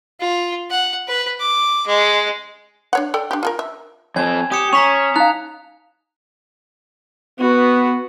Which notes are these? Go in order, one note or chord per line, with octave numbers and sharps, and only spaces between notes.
F4
F#5
B4
D6
G#3
D4 C#5 F#5
A4 D5 G5
D4 G4
F4 A4 A#4
E5
F2 C4 C#5 G#5 G#6
G4 D#6 C#7 E7
C#4 A#5 C#6 B6 F7
D#4 F5 A#5 F#6
B3 F#4